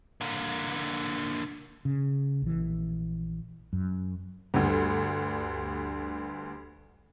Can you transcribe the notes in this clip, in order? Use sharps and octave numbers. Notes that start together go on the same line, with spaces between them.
D3 A#3
C#3
A#1 E3
F#2
D2 G2